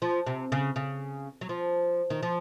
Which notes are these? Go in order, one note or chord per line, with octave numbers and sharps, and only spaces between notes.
F3
C3
C#3
C#3
F#3
F3
D#3
F3